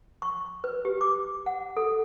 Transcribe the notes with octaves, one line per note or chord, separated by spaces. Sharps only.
C#6
B4
G4
D6
F#5
A4